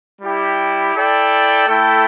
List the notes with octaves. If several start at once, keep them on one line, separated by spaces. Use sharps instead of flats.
G3 E4 G4
E4 A4 D5 G5
A3 E4 A4 G5